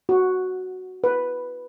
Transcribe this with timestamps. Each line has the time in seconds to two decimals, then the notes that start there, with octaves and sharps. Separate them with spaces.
0.09 F#4
1.04 B4